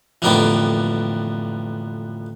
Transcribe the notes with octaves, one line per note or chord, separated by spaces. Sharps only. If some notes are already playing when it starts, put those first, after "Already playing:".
A1 F2 D3 A#3 B3 G5